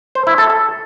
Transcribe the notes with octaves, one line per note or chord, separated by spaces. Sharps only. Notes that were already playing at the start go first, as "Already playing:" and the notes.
C5
E4
A4
A4